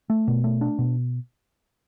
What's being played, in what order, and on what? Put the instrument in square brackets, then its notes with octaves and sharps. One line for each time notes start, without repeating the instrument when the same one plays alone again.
[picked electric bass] A3
B2
A3
D4
B2